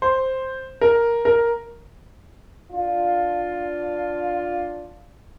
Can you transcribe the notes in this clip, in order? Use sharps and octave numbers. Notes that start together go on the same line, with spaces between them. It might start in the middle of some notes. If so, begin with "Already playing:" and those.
C5
A#4
A#4
D4 F4